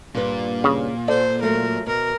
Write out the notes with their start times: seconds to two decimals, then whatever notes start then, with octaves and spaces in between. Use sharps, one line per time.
0.15 G2 A#2 B4
0.64 C#3
1.08 A4 C5 D5
1.42 F#3 A3 F4 A#4
1.87 B2 A#4